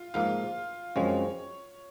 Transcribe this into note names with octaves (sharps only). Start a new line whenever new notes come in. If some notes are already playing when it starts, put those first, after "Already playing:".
Already playing: F4
G#2 F3 A#3 F4
F#2 F3 G#3 C4 C#5